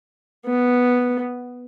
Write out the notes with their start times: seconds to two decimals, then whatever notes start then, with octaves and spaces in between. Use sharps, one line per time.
0.46 B3